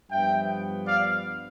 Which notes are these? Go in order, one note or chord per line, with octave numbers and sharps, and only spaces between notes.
G2 F3 B3 E5 G5
D5 F5